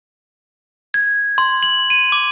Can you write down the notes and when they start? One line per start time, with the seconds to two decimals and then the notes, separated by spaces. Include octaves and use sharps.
0.94 G#6
1.38 C6
1.63 F#7
1.90 D#7
2.12 D6